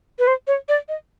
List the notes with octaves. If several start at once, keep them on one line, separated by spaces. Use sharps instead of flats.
B4
C5
C#5
D5
D#5